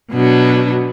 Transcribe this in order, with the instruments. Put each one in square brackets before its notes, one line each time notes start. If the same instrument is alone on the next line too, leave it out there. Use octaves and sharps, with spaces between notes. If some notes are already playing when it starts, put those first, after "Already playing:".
[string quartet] B2 F#3 B3 D4